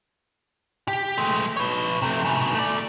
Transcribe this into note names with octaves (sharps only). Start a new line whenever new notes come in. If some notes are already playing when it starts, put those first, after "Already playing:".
G4
G#3 A3
B4 C#5
C3 A3
G#2 B2
A3 D5